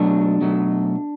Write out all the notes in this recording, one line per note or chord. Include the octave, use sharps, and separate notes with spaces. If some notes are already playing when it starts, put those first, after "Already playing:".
Already playing: B2 F#3 A3 D4
B2 F#3 A3